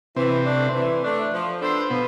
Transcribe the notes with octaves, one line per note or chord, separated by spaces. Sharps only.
C3 E3 C4
A3 D4
E3
A3 D4
F3
B3 D4 A4 C5
B2 F3 B3